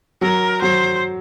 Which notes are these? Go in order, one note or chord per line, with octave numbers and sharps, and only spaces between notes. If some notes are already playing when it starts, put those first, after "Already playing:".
F#3 A#4
F#3 C5